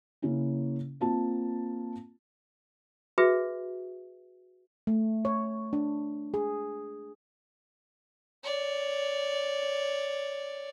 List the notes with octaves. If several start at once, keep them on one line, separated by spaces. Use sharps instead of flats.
C#3 A#3 C#4 E4
A#3 C4 F4 A5
F#4 G#4 B4 E5
A3
C#5
D4
G#4
C#5 D5